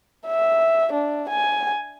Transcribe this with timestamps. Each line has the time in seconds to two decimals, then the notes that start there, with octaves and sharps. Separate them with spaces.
0.27 E5
0.93 D4
1.29 G#5